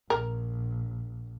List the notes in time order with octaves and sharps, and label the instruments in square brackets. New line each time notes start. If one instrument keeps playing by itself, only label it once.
[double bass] A#1 [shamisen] A#4